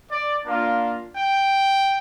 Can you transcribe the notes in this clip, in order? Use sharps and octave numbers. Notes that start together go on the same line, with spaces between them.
D5
A#3 D4 F4
G5